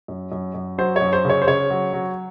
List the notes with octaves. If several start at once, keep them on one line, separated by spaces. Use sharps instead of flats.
F#2
F#2
F#2
F#3 C5
F#2 C#5
C5
C#3 C#5
C5
C#3 C#5
F#3
F#3